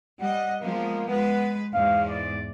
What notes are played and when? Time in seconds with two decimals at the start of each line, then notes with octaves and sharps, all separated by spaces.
0.21 G3 D#5 F#5
0.61 F3 G#3 A#3 B3
1.08 G#3 B3 B4
1.74 E2 G#2 F5
2.08 D5